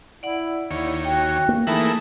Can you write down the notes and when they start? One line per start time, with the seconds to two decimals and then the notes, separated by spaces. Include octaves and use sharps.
0.23 E4 D5 F#5
0.71 D#2 E4 C#5
1.05 F#4 G5
1.49 A#3
1.67 E3 A3 A#3 D#4 G#4 A#4 A5 B5